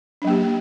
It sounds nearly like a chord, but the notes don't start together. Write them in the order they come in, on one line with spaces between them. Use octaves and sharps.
D4 F#3 A#3 G4